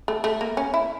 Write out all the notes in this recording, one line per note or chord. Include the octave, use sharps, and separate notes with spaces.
A3
A3
A#3
C#4
E4